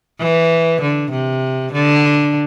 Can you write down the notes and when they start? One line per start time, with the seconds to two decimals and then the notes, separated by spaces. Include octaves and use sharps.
0.20 E3
0.81 D3
1.11 C3
1.73 D3